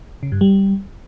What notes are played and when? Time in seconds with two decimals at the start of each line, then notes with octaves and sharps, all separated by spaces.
0.23 C#3
0.32 G2
0.41 G3